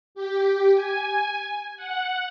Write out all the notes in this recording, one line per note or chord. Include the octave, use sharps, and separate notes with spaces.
G4
G#5
F#5